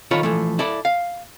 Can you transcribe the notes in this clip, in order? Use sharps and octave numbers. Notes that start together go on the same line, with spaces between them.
D#3 E4 F4 A4 C#5
E3 F3 A3
E4 A4 D5
F5